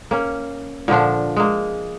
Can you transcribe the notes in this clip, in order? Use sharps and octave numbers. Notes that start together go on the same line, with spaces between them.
A#3 C#4
A#2 D3 F3 D4
G#3 A#3